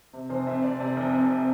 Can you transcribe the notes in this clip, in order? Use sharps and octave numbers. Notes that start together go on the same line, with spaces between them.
C3
F1 C5
F2 E5
F1 D5
C3 D5
F1
F2